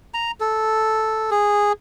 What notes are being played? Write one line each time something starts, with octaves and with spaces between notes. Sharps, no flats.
A#5
A4
G#4